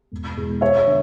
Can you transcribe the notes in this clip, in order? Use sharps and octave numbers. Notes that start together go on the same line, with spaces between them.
E1
E2 B2 G#3
E1 C#5 E5
D3